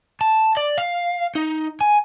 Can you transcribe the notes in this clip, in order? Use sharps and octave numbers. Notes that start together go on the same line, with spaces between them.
A5
D5
F5
D#4
G#5